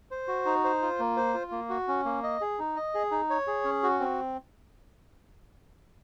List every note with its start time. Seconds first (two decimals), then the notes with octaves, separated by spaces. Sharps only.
0.11 C5
0.28 F#4
0.46 D#4
0.64 C5
0.82 F4
0.99 A#3
1.17 C5
1.34 F4
1.52 A#3
1.69 F#4
1.88 C#4
2.05 A#3
2.23 D#5
2.41 G#4
2.59 D#4
2.76 D#5
2.95 G#4
3.11 D#4
3.30 C#5
3.47 G#4
3.64 C#4
3.83 F#4
4.00 C4